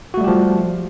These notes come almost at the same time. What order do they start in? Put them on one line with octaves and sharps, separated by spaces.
F#4 A3 G3 G4 F3